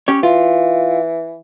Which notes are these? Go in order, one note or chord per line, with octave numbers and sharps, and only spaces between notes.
C#4 G4 C#5
E3 F4